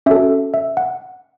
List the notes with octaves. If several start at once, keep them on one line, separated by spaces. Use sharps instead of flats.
C#4 F#4 A4 E5
E5
F#5